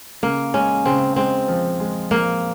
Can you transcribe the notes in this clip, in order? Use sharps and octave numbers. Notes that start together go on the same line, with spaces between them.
C#3 A#3
G#3 C#4
C#3 C4
G#3 C4
F3
G#3
F3 A#3